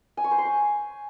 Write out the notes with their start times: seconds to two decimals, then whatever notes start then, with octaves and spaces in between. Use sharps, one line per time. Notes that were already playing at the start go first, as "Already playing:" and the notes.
0.17 G#5
0.24 C#6
0.31 C5
0.38 C6
0.45 C#6